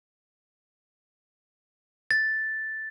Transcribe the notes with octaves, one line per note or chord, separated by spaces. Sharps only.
A6